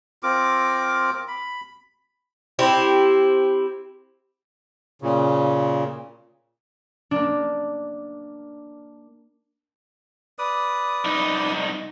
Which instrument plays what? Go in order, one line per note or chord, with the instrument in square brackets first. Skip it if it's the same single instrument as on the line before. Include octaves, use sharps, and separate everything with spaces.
[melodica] C4 F4 A#4 D6
B5
[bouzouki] C4 E4 G4
[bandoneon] A#2 C#3
[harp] A#3 D4
[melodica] B4 D5 D#6
[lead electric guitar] C2 D#4